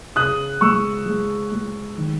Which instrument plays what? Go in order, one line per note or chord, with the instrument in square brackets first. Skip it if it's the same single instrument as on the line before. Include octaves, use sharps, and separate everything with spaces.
[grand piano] C#3 D#6 F#6
G#3 C#6 E6
G#3
G#3
D#3